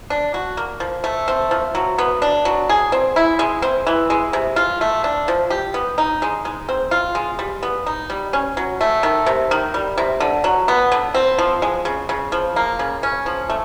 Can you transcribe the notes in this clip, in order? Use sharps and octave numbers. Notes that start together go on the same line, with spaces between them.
D4
F#4
A#3
F3
A3
C4
F3
F#3
B3
D4
F#3
G#4
C4
E4
G#3
C4
E3
G#3
C3
F4
A3
D4
F3
G4
B3
D#4
G#3
G#3
C4
F4
G#3
G3
B3
D#4
G3
C#4
F#3
A3
D#3
C3
D#3
G3
C3
D3
F#3
B3
D3
C4
F3
G#3
C#3
C#3
F3
A#3
C#3
C#4
F3
A3